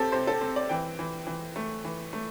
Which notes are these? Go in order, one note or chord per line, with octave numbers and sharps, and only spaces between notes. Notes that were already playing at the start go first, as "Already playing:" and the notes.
Already playing: C3 C4 G4 A4
C3 C5
A4
C4
D5
E3 G5
E3
E3
A3
E3
A3